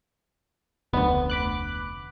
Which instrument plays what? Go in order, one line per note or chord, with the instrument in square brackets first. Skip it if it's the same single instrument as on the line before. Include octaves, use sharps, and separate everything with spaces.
[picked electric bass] F1 D2 [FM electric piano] B3
[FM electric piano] B5 D6 F#6